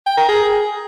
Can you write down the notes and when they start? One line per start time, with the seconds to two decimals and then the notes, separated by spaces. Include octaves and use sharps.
0.06 G5
0.17 A#4
0.28 G#4